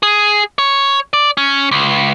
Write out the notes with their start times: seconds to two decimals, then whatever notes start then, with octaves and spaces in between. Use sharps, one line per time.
0.03 G#4
0.58 C#5
1.13 D5
1.37 C#4
1.71 C#2